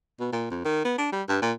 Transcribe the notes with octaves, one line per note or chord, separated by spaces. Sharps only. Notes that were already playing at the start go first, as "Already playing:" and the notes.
B2
A#2
F2
D#3
B3
D4
G3
G2
A#2